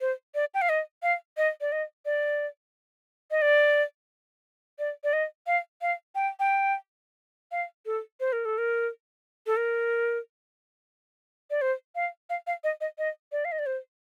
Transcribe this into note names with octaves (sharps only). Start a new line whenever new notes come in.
C5
D5
G5
F5
D#5
F5
D#5
D5
D#5
D5
D#5
D5
D5
D5
D#5
F5
F5
G5
G5
F5
A4
C5
A#4
A4
A#4
A4
A#4
D5
C5
F5
F5
F5
D#5
D#5
D#5
D5
F5
D#5
D5
C5